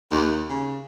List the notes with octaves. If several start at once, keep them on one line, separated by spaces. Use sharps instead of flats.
D#2
C#3